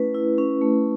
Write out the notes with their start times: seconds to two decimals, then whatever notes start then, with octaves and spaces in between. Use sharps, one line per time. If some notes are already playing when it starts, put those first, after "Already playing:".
Already playing: A3 C#4 E4 B4
0.15 E4
0.38 C#4
0.61 A3